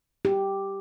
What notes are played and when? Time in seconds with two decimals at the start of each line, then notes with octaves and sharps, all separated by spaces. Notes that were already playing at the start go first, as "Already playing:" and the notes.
0.25 G4